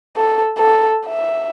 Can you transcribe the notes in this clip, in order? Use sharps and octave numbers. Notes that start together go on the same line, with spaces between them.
A4
A4
E5